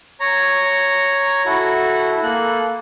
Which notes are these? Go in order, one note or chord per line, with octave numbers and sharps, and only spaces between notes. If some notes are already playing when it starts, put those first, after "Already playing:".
C#5 A#5
E4 F#4 A4
A#3 A4 F#6